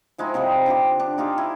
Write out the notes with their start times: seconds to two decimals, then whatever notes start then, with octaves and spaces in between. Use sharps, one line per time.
0.18 F3 G#3 D#4 E4
0.34 C3 F3 G3 D#4
0.66 D3 F4 G4
1.00 D4
1.18 D#4 F4 G4 G#4
1.38 E4